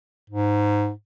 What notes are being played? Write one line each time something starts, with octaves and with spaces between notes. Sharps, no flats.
G#2